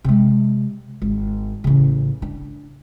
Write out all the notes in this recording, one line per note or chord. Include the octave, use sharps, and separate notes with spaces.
C3 G#3
G#1
A1 C#3
D4